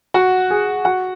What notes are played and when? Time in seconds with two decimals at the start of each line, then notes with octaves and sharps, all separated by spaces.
0.14 F#4 F#5
0.50 G#4
0.85 F#4 F#5